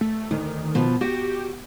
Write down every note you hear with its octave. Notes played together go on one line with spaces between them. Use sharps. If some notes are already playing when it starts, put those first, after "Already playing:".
A3
D2 D#3
B2 F3
F#4 G4